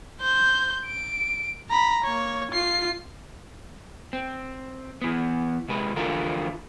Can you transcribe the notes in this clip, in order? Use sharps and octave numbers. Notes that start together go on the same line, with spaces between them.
C5 G6
D7
A#5 B5
A#3 C#5
F4 C7
C4
E3 B3
C3 G#3 B4
D3 E3 F3 A3 F4 A#4